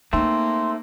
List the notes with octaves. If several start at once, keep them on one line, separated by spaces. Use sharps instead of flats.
A3 A#3 C4 D#4 C6